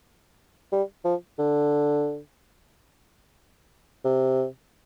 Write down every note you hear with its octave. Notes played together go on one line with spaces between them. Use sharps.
G3
F3
D3
C3